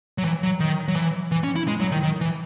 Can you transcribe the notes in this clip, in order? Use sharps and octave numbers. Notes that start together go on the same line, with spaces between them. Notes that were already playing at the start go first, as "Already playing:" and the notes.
F#3
E3
F#3
D#3
F#3
E3
E3
C#4
E4
G#3
F#3
D#3
D#3
E3